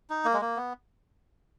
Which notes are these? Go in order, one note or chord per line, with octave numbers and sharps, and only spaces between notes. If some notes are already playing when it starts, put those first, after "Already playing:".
D#4
A#3
G#3
A#3
B3